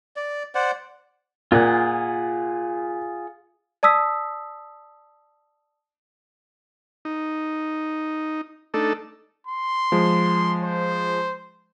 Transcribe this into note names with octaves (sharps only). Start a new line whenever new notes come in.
D5
C5 D5 F#5
A#2 F4 G#4 F#5
D5 A5 D#6 E6 B6
D#4
A3 D4 D#4 A4
C6
F3 G#3
C5